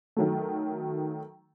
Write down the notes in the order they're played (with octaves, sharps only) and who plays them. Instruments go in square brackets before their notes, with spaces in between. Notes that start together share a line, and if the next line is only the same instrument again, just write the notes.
[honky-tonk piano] D#3 F#3 A3